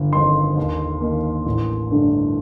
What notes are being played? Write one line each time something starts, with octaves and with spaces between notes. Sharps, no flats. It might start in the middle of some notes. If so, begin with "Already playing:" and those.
Already playing: G1
F2 D#3 C6
D#2
D#3 A#3
A1
G2 D3 A3